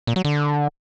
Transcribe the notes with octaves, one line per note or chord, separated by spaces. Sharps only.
A#2
F#3
D3